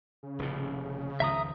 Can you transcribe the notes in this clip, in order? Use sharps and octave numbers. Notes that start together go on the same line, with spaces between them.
C#3
F1 D#2 A2
G#1 C#2 F3 E5 A#5 D#6